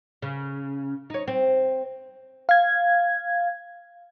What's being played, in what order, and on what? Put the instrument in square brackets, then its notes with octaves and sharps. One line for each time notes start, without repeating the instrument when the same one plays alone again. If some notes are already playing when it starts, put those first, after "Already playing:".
[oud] C#3
D#4 C#5
C4
[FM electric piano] F5 G#6